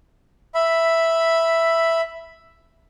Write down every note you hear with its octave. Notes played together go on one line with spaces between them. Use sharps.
E5 B5